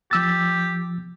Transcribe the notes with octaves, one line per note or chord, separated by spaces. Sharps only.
F3 G4 E6 A6